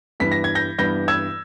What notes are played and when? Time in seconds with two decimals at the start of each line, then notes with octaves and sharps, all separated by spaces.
0.20 G2 E3 G3 B3 B6
0.32 A#6
0.44 G#6
0.55 G6 A#6
0.78 G2 E3 G3 B3 G6 A#6
1.08 E6 G#6